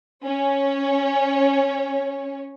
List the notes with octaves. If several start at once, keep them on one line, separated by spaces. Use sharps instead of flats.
C#4 C#5